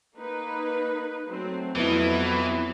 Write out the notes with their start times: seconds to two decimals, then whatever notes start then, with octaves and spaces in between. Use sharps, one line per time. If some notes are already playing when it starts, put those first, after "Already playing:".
0.16 A#3 D#4 B4
1.28 F#3 A3 C4
1.75 F2 E3 F#3 B3 C4 E4